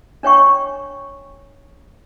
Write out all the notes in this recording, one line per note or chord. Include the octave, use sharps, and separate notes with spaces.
D4 C#5 G5 C#6